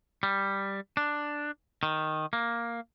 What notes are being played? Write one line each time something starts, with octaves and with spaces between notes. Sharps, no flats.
G3
D4
D#3
A#3